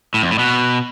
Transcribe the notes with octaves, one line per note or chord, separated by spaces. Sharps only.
A2
F2
A2
B2